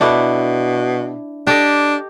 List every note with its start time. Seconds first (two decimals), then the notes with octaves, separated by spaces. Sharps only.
0.01 B2 D4 E4 A4
1.47 D4 G4 A4 D#5